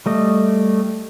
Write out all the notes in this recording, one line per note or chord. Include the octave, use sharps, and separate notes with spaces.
G3 A3 D#5